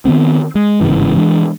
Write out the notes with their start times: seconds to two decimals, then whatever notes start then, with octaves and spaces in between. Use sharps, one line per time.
0.05 D#3 F#3 B3 C4
0.55 G#3
0.81 G1 G#2 C#3 E3
1.16 E3 G#3 D4